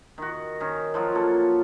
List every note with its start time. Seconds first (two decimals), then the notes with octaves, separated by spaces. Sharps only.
0.18 D#3 F#4
0.60 D#3 C#4
0.94 F3 F#3 F4
1.15 A#3 A4